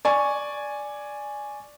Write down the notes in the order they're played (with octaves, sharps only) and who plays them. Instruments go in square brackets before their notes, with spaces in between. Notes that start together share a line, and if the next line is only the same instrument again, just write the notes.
[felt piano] D5 G#5 C#6